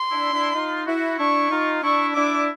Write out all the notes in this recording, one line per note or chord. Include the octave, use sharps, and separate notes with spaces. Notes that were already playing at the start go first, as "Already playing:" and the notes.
Already playing: C6
D4 E4
D4 E4
D#4 F4
E4 F#4
D4 E4 C#6
D#4 F4
D4 E4 C#6
D4 E4 D6